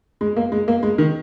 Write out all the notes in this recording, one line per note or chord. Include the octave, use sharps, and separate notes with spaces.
G#3
A#3
G#3
A#3
G#3
D#3